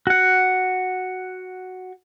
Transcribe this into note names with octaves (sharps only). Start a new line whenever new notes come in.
F#4 F#5